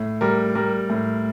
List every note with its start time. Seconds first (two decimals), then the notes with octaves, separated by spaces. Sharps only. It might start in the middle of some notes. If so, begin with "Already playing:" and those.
Already playing: A2
0.21 G3 A#4
0.55 G3 A#4
0.90 A2